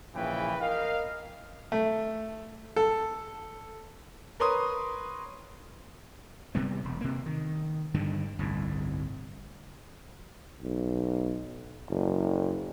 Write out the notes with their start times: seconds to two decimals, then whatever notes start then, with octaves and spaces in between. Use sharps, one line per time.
0.15 A#1 C#3 E3 B4 G5
0.60 A#4 D#5 F5
1.72 A3
2.76 A4
4.40 A#4 B4 C#5 C6 D#6
6.55 C3 G3 B3
6.85 E1
7.01 C3 A#3
7.26 D#3
7.94 G2 D3 D#3
8.39 G1 C2 A2
10.62 B1
11.90 F#1